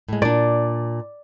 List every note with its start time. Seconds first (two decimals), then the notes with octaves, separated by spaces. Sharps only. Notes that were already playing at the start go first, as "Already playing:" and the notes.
0.09 A2 G#3
0.22 A#2 D4 D5